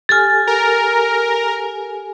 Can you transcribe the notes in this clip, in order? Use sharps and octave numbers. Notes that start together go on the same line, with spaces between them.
G4 A4 G#5 F6 A6
A#4